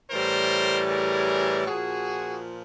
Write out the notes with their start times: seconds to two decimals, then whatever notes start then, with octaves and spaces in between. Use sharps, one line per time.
0.11 A2 E3 G3 A#4 C5
0.89 G#4 A#4
1.67 A#2 F3 F#4 G#4